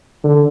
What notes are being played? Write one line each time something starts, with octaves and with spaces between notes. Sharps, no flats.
D3